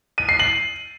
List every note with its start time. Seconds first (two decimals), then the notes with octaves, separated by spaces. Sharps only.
0.18 D#7
0.29 C7
0.39 F#7